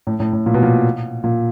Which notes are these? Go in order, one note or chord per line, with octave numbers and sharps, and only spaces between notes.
A2
A2
A2
A#2
B2
A#2
A#2